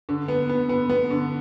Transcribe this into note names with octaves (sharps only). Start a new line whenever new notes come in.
D3
B3
B3
B3
B3
D3